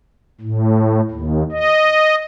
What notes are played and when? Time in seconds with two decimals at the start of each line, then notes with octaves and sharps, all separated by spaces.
0.41 A2
1.10 D#2
1.52 D#5